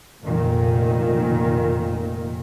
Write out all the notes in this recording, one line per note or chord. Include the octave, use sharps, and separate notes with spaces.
F1 A#2 D#3